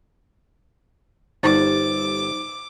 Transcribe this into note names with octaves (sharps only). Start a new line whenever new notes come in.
G1 G3 D#4 C5 D6 A6